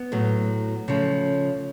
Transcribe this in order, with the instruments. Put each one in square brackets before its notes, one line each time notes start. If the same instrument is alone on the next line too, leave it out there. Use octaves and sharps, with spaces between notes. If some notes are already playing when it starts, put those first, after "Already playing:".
Already playing: [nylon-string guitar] B3
A2 F#3 A3
C#3 F3 A3